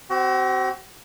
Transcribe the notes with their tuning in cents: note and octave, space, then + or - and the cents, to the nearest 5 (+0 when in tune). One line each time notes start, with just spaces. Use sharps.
C4 +0 F#4 +40